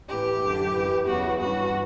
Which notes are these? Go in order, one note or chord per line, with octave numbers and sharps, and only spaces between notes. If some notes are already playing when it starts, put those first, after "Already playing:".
A2 E3 G4
F#2 D3
F#2 E3
E2 C#3 E3 F#4
G2 E3 F#4